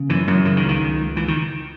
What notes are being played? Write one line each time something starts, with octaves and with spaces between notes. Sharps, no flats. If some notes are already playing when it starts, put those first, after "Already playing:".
Already playing: C#3
F#2 E3
F#2 F#3
C#3 E3
D#3
C#2
D#3
C#2
C#2
C#2 E3
D#3